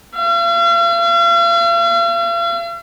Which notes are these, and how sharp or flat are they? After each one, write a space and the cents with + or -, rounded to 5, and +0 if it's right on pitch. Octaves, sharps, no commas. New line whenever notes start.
F5 -45